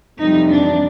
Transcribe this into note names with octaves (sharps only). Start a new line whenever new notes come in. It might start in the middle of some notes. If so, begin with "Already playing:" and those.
F2 C3 E3 G3 D#4
D4